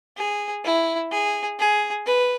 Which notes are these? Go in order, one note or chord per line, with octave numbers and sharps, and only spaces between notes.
G#4
E4
G#4
G#4
B4